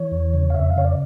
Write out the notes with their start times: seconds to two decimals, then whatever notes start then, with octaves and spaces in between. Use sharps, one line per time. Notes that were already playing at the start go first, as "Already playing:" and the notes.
Already playing: E3 C#5
0.12 E2
0.34 C#3
0.50 F5
0.54 F2 E5
0.70 F5
0.76 C#3 C#5
0.85 D5